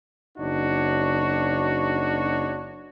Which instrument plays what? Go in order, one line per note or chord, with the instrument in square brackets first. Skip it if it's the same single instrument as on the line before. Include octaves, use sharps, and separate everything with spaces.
[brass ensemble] F#1 D4 D#4 F#4 C#5